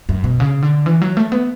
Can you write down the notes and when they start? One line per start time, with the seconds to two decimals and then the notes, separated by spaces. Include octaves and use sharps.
0.09 F#2
0.24 B2
0.40 C#3
0.62 D3
0.86 E3
1.02 F#3
1.17 A3
1.32 B3